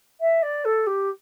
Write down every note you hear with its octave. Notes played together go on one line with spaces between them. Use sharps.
E5
D5
A4
G4